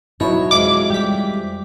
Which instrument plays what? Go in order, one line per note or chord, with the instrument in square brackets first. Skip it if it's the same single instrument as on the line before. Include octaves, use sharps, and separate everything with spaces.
[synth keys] B2 F#3 [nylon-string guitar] D#4 E4 [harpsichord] C#5
[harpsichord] F2 E3 G#3 [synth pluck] D6
[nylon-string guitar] G3 [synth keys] G4 B6